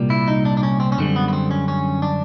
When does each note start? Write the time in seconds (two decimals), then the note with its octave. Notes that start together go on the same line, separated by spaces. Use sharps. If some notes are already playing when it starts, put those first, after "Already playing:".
Already playing: C2 A#2 G3
0.10 E4
0.28 D#4
0.45 D4
0.57 D4
0.63 C#4
0.80 C4
0.92 C#4
0.98 F#2 D3 G3 C4
1.16 B3
1.28 B3
1.33 C4
1.51 C#4
1.68 C#4
2.02 D4